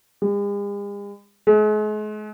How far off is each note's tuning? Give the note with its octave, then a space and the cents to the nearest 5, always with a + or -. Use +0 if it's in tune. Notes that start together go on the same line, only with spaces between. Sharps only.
G#3 -45
G#3 +40